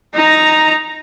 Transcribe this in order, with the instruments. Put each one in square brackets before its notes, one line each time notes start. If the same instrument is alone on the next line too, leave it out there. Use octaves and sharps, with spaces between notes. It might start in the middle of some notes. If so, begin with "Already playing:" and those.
[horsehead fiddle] D#4 A#5